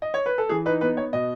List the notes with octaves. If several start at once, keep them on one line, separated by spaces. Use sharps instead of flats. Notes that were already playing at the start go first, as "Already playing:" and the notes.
D#5
C#5
B4
A4
E3 G#4
D#4 B4
B3 B4
B3 C#5
B2 D#5